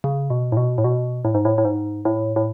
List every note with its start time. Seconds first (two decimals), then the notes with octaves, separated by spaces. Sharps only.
0.04 C#3
0.30 B2
0.52 A2
0.57 B2
0.78 A2
0.84 B2
1.25 A2
1.34 G#2
1.45 A2
1.58 A2
1.65 G#2
2.05 A2
2.36 A2